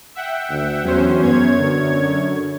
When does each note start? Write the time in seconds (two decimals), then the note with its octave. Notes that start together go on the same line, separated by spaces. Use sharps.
0.15 E5 F#5 G5
0.50 D2
0.84 E2 F#3 C#4 C5
1.22 F#2 B3 C#5 G#6
1.58 D3